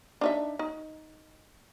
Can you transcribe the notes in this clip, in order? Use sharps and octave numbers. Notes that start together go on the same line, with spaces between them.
D4 D#4 E5
D#4